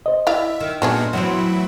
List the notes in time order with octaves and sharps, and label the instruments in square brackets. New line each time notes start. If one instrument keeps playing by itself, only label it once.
[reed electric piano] C5 D#5
[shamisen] E4 D5 F5 [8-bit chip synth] E5
[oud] D#3
[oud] A#2 [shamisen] A3 D4 G#4 [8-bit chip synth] B3 D#4 F#4
[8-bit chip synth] A2 E3 E4 [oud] F#3 B3 C4